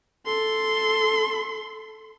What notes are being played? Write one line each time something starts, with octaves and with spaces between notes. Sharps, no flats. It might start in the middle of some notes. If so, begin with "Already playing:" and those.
A4 C6